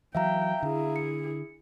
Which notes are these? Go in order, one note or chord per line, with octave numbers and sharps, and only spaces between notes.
E3 F#3 E5 F5 G5 A#5
D3 E4 G#4
C#7